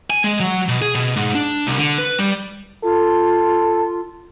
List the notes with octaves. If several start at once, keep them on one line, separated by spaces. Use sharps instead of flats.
G#5
G#3
F#3
B2
G#4
B2
G#2
D4
C2
D3
B4
G3
F4 A4